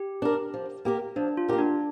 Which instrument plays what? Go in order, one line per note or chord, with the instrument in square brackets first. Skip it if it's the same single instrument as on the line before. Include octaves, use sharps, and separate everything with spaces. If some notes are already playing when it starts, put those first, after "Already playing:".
Already playing: [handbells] G4
[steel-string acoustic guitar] D4 A#4
F3
A#3 G4 A#4
[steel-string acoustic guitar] F3 [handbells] D4
[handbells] F4
[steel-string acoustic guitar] A#3 G4 A#4
[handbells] D4